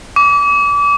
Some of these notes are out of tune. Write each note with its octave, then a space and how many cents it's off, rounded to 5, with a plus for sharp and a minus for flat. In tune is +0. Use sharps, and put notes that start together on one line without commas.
D6 -30